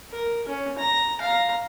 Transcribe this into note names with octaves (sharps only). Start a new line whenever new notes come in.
A#4
C#4
A#5
F5 A#5